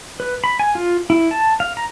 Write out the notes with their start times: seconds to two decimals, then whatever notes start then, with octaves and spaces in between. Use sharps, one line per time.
0.20 B4
0.44 B5
0.60 G#5
0.75 F4
1.10 E4
1.31 A5
1.60 F5
1.77 A#5